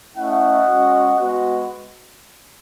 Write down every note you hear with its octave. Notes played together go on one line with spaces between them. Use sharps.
A3 C#4 E4 D#5 F#5
G#3 C#4 F#4
G#3 B3 F#4